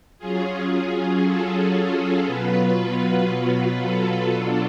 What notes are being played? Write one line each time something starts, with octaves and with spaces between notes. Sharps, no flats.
F#3 C#4 F4 G#4
A4
A4
B2 F#3 B3 F4 B4
B4
A4
B2 F#3 B3 D4 F4